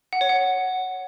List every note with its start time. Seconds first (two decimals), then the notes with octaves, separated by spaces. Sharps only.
0.13 F#5
0.21 C#5
0.29 F#5